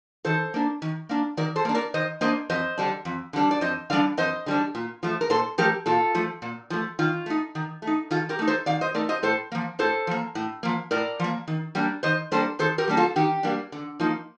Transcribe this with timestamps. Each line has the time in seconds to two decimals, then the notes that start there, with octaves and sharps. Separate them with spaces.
0.25 D#3 A4 C5
0.54 A#3 D4
0.82 D#3
1.09 A#3 D4
1.37 D#3 A#4 D5
1.56 A4 C5
1.65 A#3 D4
1.75 A#4 D5
1.94 D#3 C5 D#5
2.21 A#3 D4 C5 D#5
2.50 F2 C5 D#5
2.78 D3 G3 D4
3.05 F2
3.33 D3 G3 D4
3.51 D5
3.61 F2 C5 D#5
3.90 D3 G3 D4 D5 F5
4.17 F2 C5 D#5
4.46 D3 G3 D4
4.75 A#2
5.03 F3 A3
5.21 A#4
5.30 A#2 A4 C5
5.58 F3 A3 G4 A#4
5.86 A#2 F4 A4
6.15 F3 A3
6.42 A#2
6.70 F3 A3
6.99 D#3 F4
7.26 A3 D#4
7.55 D#3
7.82 A3
7.87 D#4
8.11 D#3 F4 A4
8.29 G4 A#4
8.39 A3 D#4
8.48 A4 C5
8.66 D#3 D5 F5
8.81 C5 D#5
8.94 A3 D#4 A#4 D5
9.09 C5 D#5
9.23 A2 A4 C5
9.52 F3 A#3
9.79 A2 A4 C5
10.07 F3 A#3
10.35 A2
10.63 F3 A#3
10.91 A2 A#4 D5
11.19 F3 A#3
11.48 D#3
11.75 G3 A#3 D4
12.03 D#3 C5 D#5
12.32 G3 A#3 D4 A4 C5
12.59 D#3 A4 C5
12.78 G4 A#4
12.88 G3 A#3 D4
12.97 F4 A4
13.16 D#3 G4
13.43 G3 A#3 D4
13.72 D3
14.00 F3 A#3 D#4